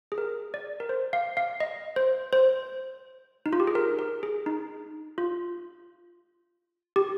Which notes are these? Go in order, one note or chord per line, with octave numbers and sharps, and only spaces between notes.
G#4
A#4
D5
A#4
C5
F5
F5
D#5
C5
C5
D#4
F4
G4
G#4
A#4
A#4
G#4
D#4
F4
G4